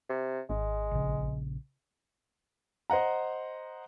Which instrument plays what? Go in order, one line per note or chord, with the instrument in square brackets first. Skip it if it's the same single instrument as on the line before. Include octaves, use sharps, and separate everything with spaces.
[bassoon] C3
[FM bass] G#1 [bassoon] G#3
[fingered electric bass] A#1 C#3
[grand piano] C5 D#5 F#5 A#5